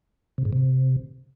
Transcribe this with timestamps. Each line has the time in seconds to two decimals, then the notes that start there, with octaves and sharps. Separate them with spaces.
0.38 C3
0.45 G#2
0.53 C3